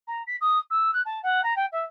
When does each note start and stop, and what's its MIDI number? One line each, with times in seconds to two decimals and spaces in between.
0.07 0.22 82
0.27 0.36 95
0.41 0.58 87
0.70 0.91 88
0.93 1.01 90
1.05 1.19 81
1.23 1.41 78
1.43 1.54 82
1.56 1.66 79
1.72 1.85 76